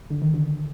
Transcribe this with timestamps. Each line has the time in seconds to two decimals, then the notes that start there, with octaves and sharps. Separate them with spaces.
0.10 D3
0.22 D#3
0.34 D3